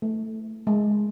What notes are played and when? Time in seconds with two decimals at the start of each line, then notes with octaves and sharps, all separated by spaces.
0.02 A3
0.67 G#3